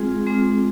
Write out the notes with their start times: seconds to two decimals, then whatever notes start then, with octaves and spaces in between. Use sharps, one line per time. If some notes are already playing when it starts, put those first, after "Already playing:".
Already playing: G#3 C4 F4 G#4
0.26 G#3 C4 F4